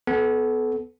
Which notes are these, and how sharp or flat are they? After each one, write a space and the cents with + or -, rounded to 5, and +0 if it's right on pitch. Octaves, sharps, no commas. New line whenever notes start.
B3 +15 A4 -30